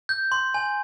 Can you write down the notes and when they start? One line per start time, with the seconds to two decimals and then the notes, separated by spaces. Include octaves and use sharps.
0.09 G6
0.32 C6
0.54 G#5